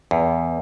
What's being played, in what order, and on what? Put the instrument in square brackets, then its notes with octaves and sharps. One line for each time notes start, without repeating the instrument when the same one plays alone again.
[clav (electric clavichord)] E2